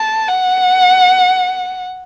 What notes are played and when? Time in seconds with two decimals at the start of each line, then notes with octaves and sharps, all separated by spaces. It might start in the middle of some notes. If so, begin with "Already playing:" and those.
Already playing: A5
0.29 F#5